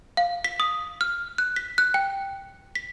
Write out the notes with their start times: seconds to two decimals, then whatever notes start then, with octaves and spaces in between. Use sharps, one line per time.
0.17 F5
0.44 B6
0.60 D#6
1.01 F6
1.38 F#6
1.56 B6
1.78 F#6
1.94 G5
2.75 B6